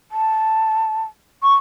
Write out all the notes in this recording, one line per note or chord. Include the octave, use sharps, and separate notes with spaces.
A5
C#6